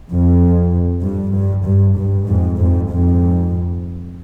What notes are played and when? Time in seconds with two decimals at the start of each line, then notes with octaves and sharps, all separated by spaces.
0.09 F2
1.03 G2
1.34 G2
1.65 G2
1.96 G2
2.27 F2 G#2
2.58 F2 G#2
2.89 F2 G#2